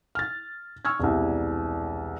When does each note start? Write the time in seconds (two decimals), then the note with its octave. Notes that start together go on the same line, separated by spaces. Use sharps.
0.15 F6 A6
0.85 C#6 E6 F6 G#6
1.00 E1 C2